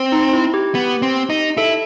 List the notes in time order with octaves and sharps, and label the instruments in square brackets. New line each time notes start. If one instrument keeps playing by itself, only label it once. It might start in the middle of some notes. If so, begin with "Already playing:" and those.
Already playing: [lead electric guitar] C4
[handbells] D#4
E4
G4
[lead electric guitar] B3
C4
D#4
[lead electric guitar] E4 [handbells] A4